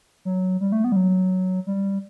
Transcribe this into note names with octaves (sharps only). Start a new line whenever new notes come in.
F#3
G3
A3
B3
G3
F#3
G3